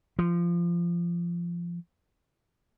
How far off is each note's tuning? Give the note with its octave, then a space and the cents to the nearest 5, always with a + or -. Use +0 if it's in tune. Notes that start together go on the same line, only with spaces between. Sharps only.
F3 -20